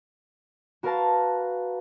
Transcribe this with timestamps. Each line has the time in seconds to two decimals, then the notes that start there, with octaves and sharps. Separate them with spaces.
0.83 F#4 A#4 B4 F5 A5